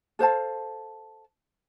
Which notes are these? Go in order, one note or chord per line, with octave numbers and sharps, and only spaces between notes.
A4 C5 F5 A5